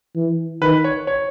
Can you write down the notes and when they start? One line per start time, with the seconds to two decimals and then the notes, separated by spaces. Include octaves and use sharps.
0.16 E3
0.61 D#3 B4
0.84 C#5
1.07 C#5